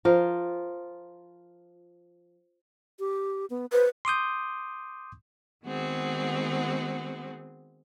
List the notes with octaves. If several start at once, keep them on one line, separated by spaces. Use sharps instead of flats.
F3 F4 A#4
G4
B3
B4 C5
C6 D6 D#6 G6
D#3 G#3 B3 C4 F#4 G#4